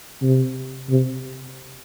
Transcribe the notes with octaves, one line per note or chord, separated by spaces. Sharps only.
C3
C3